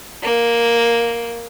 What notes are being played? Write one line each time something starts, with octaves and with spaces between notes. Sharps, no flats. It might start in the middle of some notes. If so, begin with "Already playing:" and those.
A#3